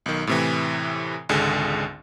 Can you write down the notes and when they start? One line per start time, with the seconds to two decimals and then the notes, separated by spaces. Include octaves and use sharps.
0.06 B1 D#3
0.27 A2 C3 E3
1.29 G#1 C#2 D3 G#4